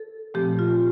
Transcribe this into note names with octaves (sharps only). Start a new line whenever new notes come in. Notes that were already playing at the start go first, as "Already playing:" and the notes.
Already playing: A4
A#2 F3 A3 C4 G4
F4